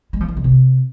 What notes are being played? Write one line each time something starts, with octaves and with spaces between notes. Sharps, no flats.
G#3
F3
E3
D3
C3